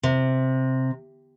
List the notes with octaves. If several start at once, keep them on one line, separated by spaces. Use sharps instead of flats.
C3